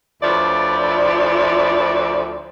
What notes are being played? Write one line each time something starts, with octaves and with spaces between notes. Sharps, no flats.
D2 F3 E4 B4 C#5 D5